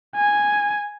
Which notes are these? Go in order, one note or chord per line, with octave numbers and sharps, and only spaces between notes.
G#5